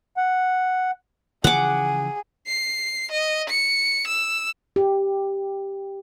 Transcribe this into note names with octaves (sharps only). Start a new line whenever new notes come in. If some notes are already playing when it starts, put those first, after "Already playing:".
F#5
C#3 E3 F3 G#4 F#5 D6
C7
D#5
C#7
E6
G4